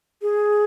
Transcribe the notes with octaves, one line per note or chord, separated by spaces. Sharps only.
G#4